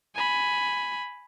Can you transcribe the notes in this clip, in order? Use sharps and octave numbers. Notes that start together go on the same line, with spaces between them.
G#5 B5